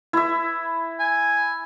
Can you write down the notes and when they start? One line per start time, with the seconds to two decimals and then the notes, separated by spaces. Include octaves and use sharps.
0.13 E4 E5
0.99 G#5